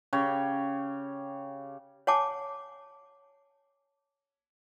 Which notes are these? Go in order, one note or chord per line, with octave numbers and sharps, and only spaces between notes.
C#3 G4 C#5 D6
C#5 F#5 G#5 A5 D6